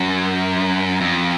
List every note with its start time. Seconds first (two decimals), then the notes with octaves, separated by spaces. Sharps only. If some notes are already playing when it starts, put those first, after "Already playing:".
Already playing: F#2
1.01 F2